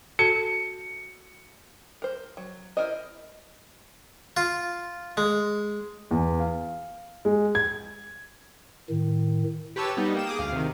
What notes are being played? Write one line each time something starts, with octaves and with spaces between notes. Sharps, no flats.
F#4 A4 A5 C#7
A#4 C5
F#3
E4 A#4 C5 D#5
F4
G#3
E2
F5
G#3
G#6
A2 D#3
G4 B4 C#5 A5 E6
G3 B3 D#4
A#3 G5 E7
G#4 D6 D#6
D2 F5
C3 D#3